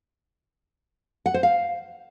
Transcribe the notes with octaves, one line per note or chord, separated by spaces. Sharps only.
F#5
C5
F5